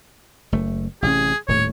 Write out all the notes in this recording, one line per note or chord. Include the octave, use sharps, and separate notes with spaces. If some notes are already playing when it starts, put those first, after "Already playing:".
F#1 A3
A1 C3 C#4 G#4
D#1 A2 C#5